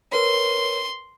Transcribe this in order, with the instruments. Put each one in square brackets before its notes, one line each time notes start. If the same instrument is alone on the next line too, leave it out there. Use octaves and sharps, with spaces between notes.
[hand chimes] A#4 B4 C#5 [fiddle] C6